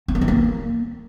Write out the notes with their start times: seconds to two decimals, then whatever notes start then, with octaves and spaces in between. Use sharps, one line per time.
0.08 C4
0.15 B3
0.21 F3
0.28 A#3